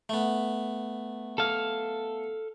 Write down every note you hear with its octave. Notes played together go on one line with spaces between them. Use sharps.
A3 B3
A4 F5